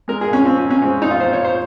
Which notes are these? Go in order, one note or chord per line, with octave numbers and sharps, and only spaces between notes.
G#3 A#4
G#4
A#2
C#4
F3 C4
C#4
A#2
C#4
G#3 C4
A#2 D#4
F4
F3 C5
C#5
A#2
C5